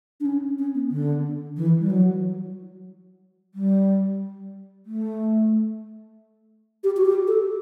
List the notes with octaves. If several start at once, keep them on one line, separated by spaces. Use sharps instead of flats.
D4
C#4
C#4
B3
D3
E3
G3
F#3
G3
A3
G4
F#4
G4
A4